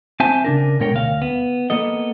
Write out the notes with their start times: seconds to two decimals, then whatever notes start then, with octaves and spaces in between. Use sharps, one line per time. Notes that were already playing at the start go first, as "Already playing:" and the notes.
0.20 C4 C5 E5 G#5 A5
0.44 C#3 D4 A#4
0.80 B2 G#3 A#4 C#5 G5
0.93 D2 F5
1.22 B3
1.70 A#3 B3 A4 D#5